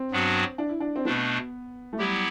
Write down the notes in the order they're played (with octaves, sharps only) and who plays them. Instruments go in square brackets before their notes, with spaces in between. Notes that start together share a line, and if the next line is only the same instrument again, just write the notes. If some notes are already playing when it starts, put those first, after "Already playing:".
Already playing: [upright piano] C4
[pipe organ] G2 F#3 B3 D4 F#4
[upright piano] D4
E4
D4
C4
[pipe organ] B2 A3 D4 [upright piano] B3
[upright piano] A3
[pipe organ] F#3 B3 E4 G4 [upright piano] G3